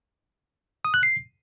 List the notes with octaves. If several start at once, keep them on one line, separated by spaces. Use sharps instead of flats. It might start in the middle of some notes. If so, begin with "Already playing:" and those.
D#6
F#6
C7